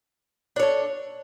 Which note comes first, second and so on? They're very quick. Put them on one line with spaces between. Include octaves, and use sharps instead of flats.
D4 C#5 A4